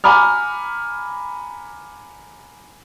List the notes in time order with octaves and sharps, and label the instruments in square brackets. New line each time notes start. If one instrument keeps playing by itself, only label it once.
[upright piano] F#5 G#5 A#5 B5 D6 F6